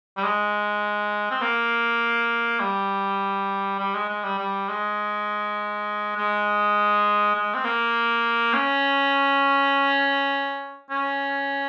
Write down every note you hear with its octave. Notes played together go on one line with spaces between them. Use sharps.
G3
G#3
C4
A#3
G3
G3
G#3
G#3
G3
G3
G#3
G#3
G#3
C4
A#3
C#4
C#4